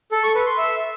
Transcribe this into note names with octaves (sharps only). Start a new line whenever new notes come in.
A4
C#6
B4
C6
E5